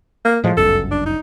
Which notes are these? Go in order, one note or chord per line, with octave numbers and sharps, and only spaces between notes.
A#3
A2 F3 G#3
G1 C#2 F#2 A4
D4
D#4